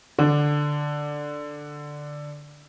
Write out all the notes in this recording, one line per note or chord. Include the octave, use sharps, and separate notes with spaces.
D3 D4